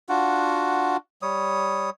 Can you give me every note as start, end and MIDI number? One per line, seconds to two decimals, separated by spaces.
0.09 0.97 62
0.09 0.97 65
0.09 0.97 66
0.09 0.97 78
1.22 1.90 55
1.22 1.90 73
1.22 1.90 87